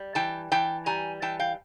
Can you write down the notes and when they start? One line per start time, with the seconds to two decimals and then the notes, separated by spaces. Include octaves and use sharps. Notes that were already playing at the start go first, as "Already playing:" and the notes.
Already playing: G3
0.15 E3 G5 A5
0.52 E3 G5 A5
0.86 G3 G#5 A#5
1.22 E3 G5 A5
1.40 F5 G5